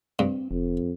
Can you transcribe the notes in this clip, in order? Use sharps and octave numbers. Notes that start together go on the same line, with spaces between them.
G2 C4
F1 F2